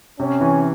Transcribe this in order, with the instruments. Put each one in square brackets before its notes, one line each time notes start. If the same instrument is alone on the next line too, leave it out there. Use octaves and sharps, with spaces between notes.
[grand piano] C3 [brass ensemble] C#4
[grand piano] E3